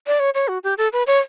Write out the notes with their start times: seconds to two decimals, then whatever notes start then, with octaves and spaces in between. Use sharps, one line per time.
0.07 D5
0.20 C#5
0.34 C#5
0.48 F#4
0.64 G4
0.78 A4
0.93 B4
1.07 C#5